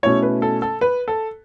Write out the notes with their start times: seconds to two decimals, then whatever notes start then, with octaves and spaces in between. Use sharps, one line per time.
0.03 B2 A3 C#4 E4 C#5
0.23 B4
0.42 A4
0.62 A4
0.81 B4
1.08 A4